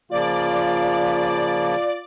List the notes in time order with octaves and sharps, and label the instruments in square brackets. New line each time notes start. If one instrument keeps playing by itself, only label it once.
[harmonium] C#3 F3 A#3 [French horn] F4 [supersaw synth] D5